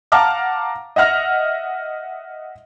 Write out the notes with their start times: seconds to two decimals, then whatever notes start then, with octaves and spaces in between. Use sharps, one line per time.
0.12 F5 F#5 A5 A#5 D6 F6
0.96 D#5 E5 F#5 F6 A#6